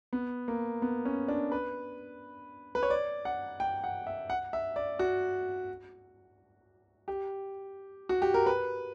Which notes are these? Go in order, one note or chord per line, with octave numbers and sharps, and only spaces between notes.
B3
A#3
B3
C#4
D4
B4
B4
C#5
D5
F#5
G5
F#5
E5
F#5
E5
D5
F#4
G4
F#4
G4
A#4
B4